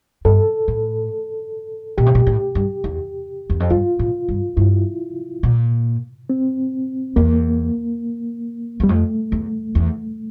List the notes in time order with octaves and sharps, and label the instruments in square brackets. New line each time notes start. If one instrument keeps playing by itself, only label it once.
[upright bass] G2 [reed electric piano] A4
[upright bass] A2
[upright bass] A#2 [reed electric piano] G4
[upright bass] C3
A#2
A2
G2
E2
E2
F2
[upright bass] G2 [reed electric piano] F4
[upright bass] A2
G2
[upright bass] G2 [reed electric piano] E4
[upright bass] A#2
[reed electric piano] C4
[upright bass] E2 [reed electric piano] A#3
[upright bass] E2 [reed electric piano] G3
[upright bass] F2 [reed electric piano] A3
[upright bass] E2
E2